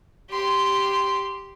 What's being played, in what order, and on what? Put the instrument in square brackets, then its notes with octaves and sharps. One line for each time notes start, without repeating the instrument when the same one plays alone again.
[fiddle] G4 C6